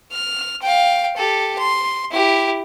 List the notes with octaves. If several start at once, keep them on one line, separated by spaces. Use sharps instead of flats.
F6
F5 G5
G4 A4
C6
E4 G4